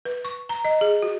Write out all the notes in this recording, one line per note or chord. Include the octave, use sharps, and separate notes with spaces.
B4
C#6
A#5
D#5
G#4
F#4